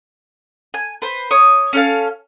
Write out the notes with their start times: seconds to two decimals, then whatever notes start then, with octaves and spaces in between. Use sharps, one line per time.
0.74 G#5
1.02 B4 C5
1.31 C#5 D#6
1.73 C#4 A4 F5